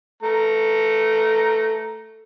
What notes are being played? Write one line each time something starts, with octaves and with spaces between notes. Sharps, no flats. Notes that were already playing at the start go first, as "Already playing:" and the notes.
A3 A#5